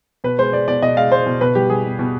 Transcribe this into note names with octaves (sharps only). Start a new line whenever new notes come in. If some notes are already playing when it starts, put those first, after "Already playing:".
B2 B4
G#3 C5
G#3 D5
B2 D5
B2 D#5
G#3 F5
G#3 C5
B2
B2 B4
G3 G4
G3 G#4
B2
B2